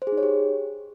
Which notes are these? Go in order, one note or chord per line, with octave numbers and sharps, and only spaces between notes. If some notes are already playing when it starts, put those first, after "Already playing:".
C5
G#4
D#4
C#5
G4